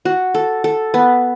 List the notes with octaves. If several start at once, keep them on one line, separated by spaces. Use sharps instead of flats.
F#4
A4
A4
B3